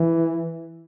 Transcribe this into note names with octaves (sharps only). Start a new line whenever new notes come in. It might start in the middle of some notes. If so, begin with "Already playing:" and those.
Already playing: E3